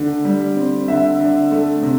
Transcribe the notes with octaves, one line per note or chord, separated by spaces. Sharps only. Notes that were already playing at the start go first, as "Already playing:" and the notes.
Already playing: D3 A3
G3
C4
D3 E5
D3
A3
C3